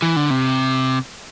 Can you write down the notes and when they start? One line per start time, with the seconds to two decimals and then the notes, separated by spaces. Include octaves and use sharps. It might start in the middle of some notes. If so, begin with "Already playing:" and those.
0.02 E3
0.16 D3
0.30 C3